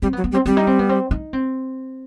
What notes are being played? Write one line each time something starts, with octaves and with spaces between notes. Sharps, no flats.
G3 C4
B3
F#3
B3
G3
C4
G3 C4
D#4
C4
B3
C4
D#4
C4